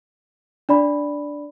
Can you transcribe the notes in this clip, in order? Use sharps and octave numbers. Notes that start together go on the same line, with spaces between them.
D4 D5 B5